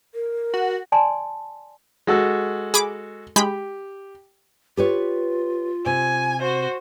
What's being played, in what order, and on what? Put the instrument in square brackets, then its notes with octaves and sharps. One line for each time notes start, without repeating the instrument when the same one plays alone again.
[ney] A#4
[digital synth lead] F#4
[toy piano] D5 G#5 A5 C6
[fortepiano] G#3 F#4 A4
[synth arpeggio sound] G#4 B5 D6
[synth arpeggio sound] G#3 B5 G6 [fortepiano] G4
[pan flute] F4 [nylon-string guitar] G4 B4 C#5
[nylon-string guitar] C3 [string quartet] G#5
[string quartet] F#4 C5